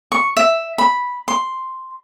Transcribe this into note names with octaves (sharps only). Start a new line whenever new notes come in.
C#6
E5
B5
C6